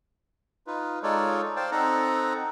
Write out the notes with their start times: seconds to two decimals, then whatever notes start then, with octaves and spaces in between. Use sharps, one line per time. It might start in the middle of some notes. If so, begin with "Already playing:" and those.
0.67 D#4 F4 B4
1.03 G#3 D#4 F4 A4 C#5 D5
1.56 C5 D5 F5 G5 A5
1.72 C4 D#4 A4 F#5 A#5